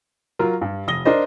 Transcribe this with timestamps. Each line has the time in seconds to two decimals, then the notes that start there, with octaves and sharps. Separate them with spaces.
0.39 F#3 F4 A#4
0.61 G2
0.87 F1 D#6 A#6 G7
1.05 D4 A#4 C5 D#5